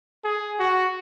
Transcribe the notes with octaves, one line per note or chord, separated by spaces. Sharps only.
G#4
F#4